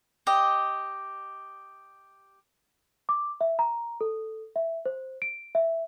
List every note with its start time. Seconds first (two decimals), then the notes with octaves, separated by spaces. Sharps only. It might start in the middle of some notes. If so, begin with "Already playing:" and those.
0.27 G4 D#5
3.09 D6
3.41 E5
3.59 A#5
4.01 A4
4.56 E5
4.85 C5
5.22 D7
5.55 E5